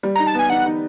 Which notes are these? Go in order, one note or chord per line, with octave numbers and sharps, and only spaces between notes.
G3
D#4 A#5
A5
B3 G#5
D#4 F#5
D#4